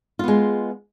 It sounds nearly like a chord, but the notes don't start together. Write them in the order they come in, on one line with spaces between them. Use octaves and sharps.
F4 B3 G#3